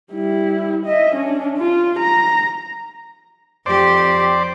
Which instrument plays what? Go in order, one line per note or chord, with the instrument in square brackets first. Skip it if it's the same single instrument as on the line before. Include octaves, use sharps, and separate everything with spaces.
[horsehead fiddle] G3 E4
D#5 E5
C#4 D4
F4
A#5
[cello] F2 G4 [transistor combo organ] C5 D5